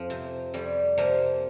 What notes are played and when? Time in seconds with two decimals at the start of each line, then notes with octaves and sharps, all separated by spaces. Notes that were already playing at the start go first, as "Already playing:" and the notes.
Already playing: F2 F3
0.10 C3
0.54 F2 G3
0.98 C3 F3 A#3